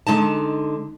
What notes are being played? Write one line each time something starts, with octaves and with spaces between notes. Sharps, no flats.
D3 G#3 D#4 A5